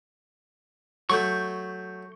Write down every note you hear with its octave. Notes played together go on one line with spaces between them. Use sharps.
F#3 A3 C#6 G6